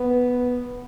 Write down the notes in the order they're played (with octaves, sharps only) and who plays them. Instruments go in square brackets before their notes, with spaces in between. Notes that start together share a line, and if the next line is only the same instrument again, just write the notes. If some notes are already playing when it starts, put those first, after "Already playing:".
Already playing: [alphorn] B3